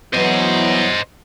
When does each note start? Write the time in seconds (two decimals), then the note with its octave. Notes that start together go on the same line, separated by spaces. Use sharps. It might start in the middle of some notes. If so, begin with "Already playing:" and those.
0.14 E3 F#3 B3 C5 D#5